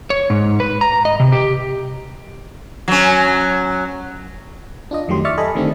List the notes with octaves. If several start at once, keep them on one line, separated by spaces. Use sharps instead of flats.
C#5
G#2
B4
A#5
D#5
C3
G4
F#3 C#4
D4 F4 D#5
F2 D#3 F#3 A3 G4 C6
D5 E5 C#6 F6 A6 C#7
A4 D#5 G#5 B5
D3 D#3 A3 C4 D4 G4